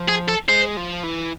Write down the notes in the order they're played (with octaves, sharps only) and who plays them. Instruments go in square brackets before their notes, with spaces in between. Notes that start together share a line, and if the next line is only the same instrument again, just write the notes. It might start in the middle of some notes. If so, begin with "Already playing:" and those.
Already playing: [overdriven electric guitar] F3
[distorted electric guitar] G#4
A4
[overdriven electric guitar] G#3 [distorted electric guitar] C5
[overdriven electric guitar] F3
E3